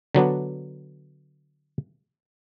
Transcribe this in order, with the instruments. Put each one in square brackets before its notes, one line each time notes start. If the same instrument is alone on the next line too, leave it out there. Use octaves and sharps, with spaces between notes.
[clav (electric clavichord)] D3 F#3 B3 D4